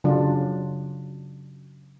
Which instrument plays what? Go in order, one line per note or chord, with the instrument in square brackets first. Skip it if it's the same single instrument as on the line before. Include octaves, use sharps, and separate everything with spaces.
[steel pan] C#3 F#3 D4 F4